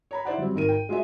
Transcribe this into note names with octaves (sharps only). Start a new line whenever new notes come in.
C#5 A#5 B5
E4 C5 D5 F#5
F#3 G3 C4
G#1 D#3 A#4 D#7
G5
G#3 F4 F#4 D#5 E5